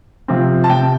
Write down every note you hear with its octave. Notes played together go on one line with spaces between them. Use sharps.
C3 F3 C4
A5
C3 G5